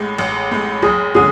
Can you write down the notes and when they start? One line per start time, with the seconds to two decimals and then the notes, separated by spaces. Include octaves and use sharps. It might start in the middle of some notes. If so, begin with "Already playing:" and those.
Already playing: A1 A2 G#3
0.18 A1
0.51 A2 G#3
0.82 F#1 G#4
1.14 D3 G#3 C#4 G#4